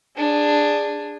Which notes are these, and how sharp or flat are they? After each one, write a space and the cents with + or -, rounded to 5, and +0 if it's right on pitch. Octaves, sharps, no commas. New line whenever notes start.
D4 +5 G#4 -15